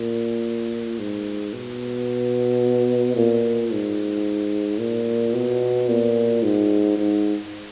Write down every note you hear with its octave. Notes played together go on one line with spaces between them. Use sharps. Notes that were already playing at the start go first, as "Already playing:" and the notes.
Already playing: A#2
G#2
B2
A#2
G#2
A#2
B2
A#2
G#2
G#2